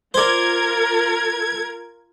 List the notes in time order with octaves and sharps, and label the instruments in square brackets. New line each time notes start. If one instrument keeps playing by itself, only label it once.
[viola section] F4 A#4 [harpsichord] C5 D5 [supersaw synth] G#6